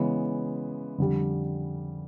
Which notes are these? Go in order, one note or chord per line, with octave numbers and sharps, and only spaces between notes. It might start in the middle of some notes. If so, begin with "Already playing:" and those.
Already playing: C#3 E3 G#3 B3
F2 D3 G3